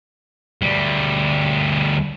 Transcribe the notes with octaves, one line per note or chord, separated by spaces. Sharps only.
D2 G3